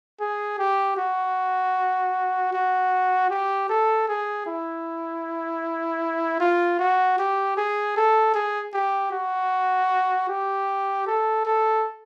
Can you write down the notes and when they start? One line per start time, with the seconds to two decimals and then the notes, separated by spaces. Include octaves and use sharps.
0.20 G#4
0.59 G4
0.97 F#4
2.53 F#4
3.30 G4
3.69 A4
4.08 G#4
4.47 E4
6.40 F4
6.79 F#4
7.19 G4
7.57 G#4
7.97 A4
8.34 G#4
8.74 G4
9.12 F#4
10.29 G4
11.07 A4
11.45 A4